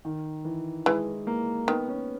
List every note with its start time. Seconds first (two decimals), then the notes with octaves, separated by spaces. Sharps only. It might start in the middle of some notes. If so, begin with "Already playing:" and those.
0.05 D#3
0.45 E3
0.86 E3 G#3
1.27 A#3
1.68 D#3 B3
1.88 C#4